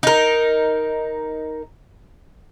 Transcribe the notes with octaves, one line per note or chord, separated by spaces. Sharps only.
D#4 A#4